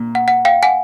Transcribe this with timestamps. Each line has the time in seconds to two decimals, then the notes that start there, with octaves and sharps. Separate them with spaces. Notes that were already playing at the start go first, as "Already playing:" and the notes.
Already playing: A#2
0.15 F#5
0.28 F#5
0.45 F5 G5
0.63 F#5 G#5